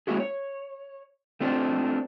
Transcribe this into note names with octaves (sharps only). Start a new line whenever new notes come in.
G#3 A#3 C#4 E4 F#4 G#4
C#5
A3 C4 D4 F4 C5